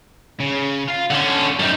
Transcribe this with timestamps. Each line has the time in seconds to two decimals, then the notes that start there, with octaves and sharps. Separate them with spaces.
0.40 C#3
0.88 F4 F5
1.11 D3 C#4 F#5 A5
1.59 F#2 G3 D#4